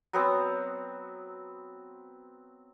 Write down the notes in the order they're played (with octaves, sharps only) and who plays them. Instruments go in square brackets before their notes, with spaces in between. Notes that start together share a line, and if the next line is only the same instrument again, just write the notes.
[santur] F#3 B3 C4